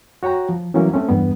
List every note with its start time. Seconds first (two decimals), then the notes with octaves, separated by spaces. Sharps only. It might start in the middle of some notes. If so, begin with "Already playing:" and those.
0.23 F#4 C#5 G5 A#5
0.49 F3
0.74 E3 F#3 G3 A#3 C#4 E4
0.93 A3 C4 C#4
1.09 E2 G2 G3 B3